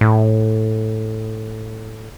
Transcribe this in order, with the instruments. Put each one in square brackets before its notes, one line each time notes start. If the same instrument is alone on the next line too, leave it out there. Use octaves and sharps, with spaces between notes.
[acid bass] A2